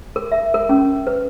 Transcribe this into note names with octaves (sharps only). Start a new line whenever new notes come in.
A#4
E5
A#4
C#4
B4